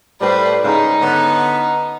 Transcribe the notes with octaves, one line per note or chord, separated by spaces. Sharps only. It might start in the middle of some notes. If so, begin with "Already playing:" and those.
A2 G3 B4 C5
G#2 C#3 D#4
D3 B3 C#4